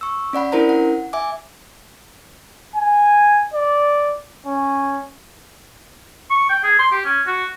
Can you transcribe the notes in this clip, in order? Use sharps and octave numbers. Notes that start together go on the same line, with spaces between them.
C#6 E6
C#4 D5 F#5 B5
C#4 D4 E4 A#4 C5 A#5
F#5
E5 G#5 D6
G#5
D5
C#4
C#6
G5
G#4
C6
G4
C#4
F#4